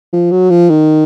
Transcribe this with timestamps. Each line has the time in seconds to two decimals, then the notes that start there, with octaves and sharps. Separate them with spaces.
0.13 F3
0.31 F#3
0.50 F3
0.70 D#3